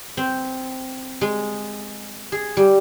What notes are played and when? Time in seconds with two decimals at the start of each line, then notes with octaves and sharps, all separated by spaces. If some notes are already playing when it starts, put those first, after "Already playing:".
0.17 C4
1.21 G#3
2.32 G#4
2.57 G3